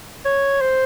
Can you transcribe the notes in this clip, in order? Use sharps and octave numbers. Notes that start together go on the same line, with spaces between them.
C#5
C5